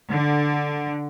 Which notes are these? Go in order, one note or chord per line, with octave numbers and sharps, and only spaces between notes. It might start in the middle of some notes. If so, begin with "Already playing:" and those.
D3